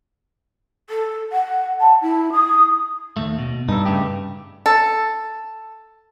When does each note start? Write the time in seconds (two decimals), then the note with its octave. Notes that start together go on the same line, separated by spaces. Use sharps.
0.90 A4
1.32 F#5
1.80 A5
2.02 E4
2.33 D#6
3.17 D#2 A3
3.39 B2
3.68 G2 D#4 A4
3.86 C#3 A3 G4
4.66 A4